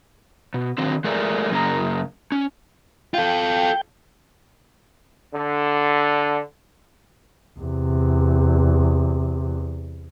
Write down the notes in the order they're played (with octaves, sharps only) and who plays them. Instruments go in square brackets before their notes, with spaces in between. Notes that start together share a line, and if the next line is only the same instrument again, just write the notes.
[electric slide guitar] B2
D3 D#3 F#3 C4
G#3 A3 G#4 A#4 D5
F#2 C#3 A#3 G#4 A#5
C#4
[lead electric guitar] F4 A4 [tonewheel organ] G5
[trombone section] D3
[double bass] E2 C3